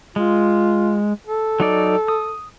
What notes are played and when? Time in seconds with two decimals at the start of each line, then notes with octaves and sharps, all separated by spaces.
0.16 G#3 F4
1.26 A4
1.60 F#3 D#4 D5
2.08 D#6